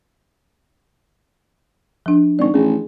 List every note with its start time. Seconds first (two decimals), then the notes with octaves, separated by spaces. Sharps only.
2.06 F3 D4
2.39 G#1 D5 C#6
2.54 A1 G#4